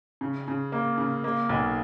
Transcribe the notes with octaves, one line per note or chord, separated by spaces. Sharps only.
C#3
C#3
A#3
C#3
A#3
B1